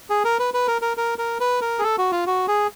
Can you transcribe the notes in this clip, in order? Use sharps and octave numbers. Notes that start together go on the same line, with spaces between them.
G#4
A#4
B4
B4
A#4
A#4
A#4
A#4
B4
A#4
G#4
A4
F#4
F4
F#4
G#4